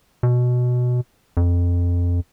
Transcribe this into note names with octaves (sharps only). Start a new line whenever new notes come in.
B2
F2